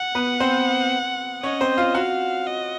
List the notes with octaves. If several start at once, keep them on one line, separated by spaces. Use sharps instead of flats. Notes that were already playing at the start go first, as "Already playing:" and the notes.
Already playing: F#5
B3 B4
C4 C5
C#4 C#5 D#5
C4 C5
F4 F5
F#4 F5 F#5
D#5